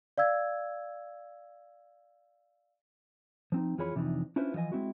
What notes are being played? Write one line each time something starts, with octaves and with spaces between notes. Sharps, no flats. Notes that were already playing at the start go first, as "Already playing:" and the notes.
D5 F5 E6 G#6
F3 C4 D#4
F2 E3 F4 G#4 C#5 B5
F2 C3 E3 F3 D4 D#4
C#4 D4 E4 F4 B4 C5
E3 F3 B4 D#5 G#5
G#3 C4 E4 F#4